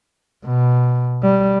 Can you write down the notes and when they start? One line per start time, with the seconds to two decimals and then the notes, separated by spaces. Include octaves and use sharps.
0.44 B2
1.22 G3